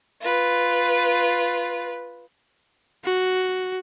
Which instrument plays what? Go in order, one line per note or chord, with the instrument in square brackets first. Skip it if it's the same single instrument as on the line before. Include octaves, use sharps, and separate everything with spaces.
[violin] F4 B4
[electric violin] F#4